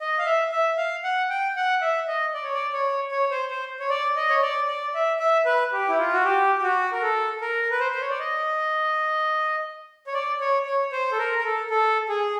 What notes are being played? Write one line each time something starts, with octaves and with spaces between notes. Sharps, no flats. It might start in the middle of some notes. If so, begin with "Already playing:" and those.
D#5
F5
E5
E5
F5
F#5
G5
F#5
E5
D#5
D5
C#5
D5
C#5
C#5
C5
C5
C#5
D5
D#5
C#5
D5
D5
E5
E5
B4
G4
E4
F4
F#4
G4
G4
F#4
A#4
A4
A#4
B4
C5
C5
C#5
D5
D#5
C#5
D5
C#5
C#5
C5
A4
A#4
A#4
A4
A4
G#4